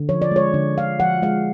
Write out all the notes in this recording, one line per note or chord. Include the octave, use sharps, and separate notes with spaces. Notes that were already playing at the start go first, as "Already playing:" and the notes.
Already playing: D3
F3 C#5
D5
G#3 C#5
D3
D3 F5
F3 F#5
G#3 F5